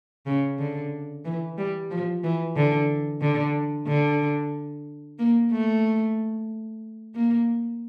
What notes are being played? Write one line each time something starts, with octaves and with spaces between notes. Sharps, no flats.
C#3
D3
E3
G3
F3
E3
D3
D3
D3
A#3
A3
A#3